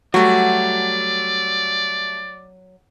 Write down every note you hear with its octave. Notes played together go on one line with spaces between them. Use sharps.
F#3 G3 A3 F#4 D5